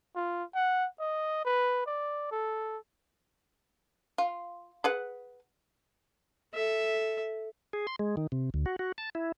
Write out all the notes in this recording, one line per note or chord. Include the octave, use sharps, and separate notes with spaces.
F4
F#5
D#5
B4
D5
A4
F4
G#4 B4 F#5
A4 E5
G#4
C6
G#3
D#3
C3
D2
F#4
F#4
A5
E4